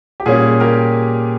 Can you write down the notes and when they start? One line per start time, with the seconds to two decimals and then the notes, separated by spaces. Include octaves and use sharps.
0.20 G4
0.26 A#2 G3 C#4 G#4
0.60 G4 A#4